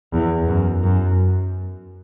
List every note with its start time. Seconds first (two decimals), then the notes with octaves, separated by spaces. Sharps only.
0.13 E2
0.48 F#2
0.84 F#2